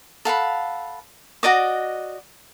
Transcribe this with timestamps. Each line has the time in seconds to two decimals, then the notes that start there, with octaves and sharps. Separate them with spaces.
0.25 A4 F5 F#5 B5
1.43 F#4 D5 D#5 D6